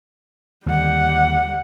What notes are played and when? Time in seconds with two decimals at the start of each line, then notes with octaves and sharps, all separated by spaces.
0.66 D#2 D3 G3 F#5